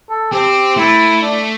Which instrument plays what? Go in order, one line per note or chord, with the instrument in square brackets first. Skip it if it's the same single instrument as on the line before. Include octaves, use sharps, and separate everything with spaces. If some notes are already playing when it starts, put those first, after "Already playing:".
[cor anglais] A4
[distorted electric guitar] C4 [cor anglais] G4
[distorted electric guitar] A3 [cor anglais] E4
[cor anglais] D4